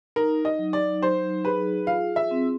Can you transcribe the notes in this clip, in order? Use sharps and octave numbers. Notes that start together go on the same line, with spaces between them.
D#4 A#4
D#5
F#3
D5
F#3 C5
G#4 B4
F4 F5
E5
C4